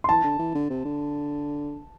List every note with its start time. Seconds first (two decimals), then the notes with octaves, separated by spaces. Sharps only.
0.04 C6
0.09 E3 A5
0.24 D3
0.39 E3
0.55 D3
0.70 C3
0.85 D3